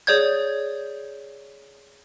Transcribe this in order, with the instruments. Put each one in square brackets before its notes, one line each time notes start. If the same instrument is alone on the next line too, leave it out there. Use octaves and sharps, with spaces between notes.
[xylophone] G#4 C#5 D5 G6 G#6